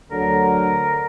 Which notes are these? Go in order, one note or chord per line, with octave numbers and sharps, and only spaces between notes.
D2 D3 F#3 A#4